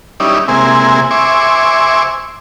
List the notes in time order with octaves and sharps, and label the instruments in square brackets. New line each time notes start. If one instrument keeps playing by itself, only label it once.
[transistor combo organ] G3 C#4 D#4 E4 D5
C3 G#3 A#3 C4 E4 G#5
C5 E5 G#5 C#6 D6